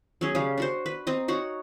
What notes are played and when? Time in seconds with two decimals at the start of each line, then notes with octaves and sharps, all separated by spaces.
0.21 F#3 C#4 G#4
0.35 C#3 G3 F5
0.58 D4 F#4 C5
0.86 B4
1.07 C4 D#5 A#5
1.28 D#4 F#4 C#5 F#5